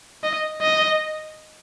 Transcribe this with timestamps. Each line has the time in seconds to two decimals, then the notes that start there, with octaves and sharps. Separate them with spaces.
0.24 D#5
0.62 D#5